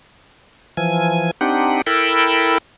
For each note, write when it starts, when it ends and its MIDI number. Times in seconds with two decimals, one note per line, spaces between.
0.77 1.31 52
0.77 1.31 53
0.77 1.31 80
1.41 1.82 60
1.41 1.82 62
1.41 1.82 63
1.41 1.82 67
1.41 1.82 78
1.86 2.58 64
1.86 2.58 69
1.86 2.58 70
1.86 2.58 79
1.86 2.58 83
1.86 2.58 88